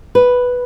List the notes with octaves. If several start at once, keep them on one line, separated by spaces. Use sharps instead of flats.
B4